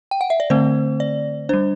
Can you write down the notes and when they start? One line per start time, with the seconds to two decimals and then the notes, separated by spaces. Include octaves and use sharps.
0.11 G5
0.21 F#5
0.30 E5
0.40 D5
0.50 D3 A3 C4 C5
1.00 D5
1.49 G3 D4 C5